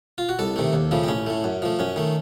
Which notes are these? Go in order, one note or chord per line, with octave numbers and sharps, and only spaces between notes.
F4
F#4
C2 A4
C3 D#3 A3
D#2
C#3 F3 A3
C4
A1 C#4
A2 A3
F#2
F3 A3
F#2 C#4
D#3 A3